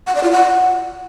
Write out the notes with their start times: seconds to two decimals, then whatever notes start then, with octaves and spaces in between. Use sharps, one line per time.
0.07 F#5
0.15 D5
0.24 F4
0.32 F#5